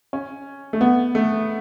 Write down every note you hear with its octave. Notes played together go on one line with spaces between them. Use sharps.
C#4
A3
B3
A3